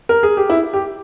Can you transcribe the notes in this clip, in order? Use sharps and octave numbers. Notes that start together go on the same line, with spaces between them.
A#4
G#4
G4
E4
G4